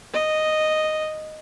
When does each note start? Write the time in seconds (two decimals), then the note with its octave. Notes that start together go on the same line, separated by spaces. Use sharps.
0.14 D#5